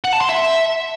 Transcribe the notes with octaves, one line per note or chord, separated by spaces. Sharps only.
F#5
A5
C6
E5